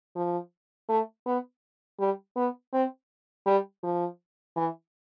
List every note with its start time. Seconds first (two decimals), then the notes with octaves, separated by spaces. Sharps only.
0.16 F3
0.89 A3
1.26 B3
1.99 G3
2.36 B3
2.73 C4
3.46 G3
3.83 F3
4.56 E3